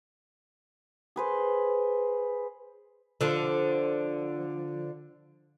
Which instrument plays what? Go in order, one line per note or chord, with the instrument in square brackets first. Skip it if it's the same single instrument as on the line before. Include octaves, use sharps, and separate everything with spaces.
[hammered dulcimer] G#4 B4 C5
[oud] D3 F3